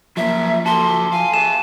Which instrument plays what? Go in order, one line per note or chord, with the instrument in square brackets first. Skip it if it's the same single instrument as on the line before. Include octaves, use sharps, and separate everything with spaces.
[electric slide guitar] F3 [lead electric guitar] F#3 A#3 [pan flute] E5
[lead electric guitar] F#4 A4 [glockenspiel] A5 [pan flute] C6
[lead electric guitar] F5 [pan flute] G#5
[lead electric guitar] G#4 E5 [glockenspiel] E7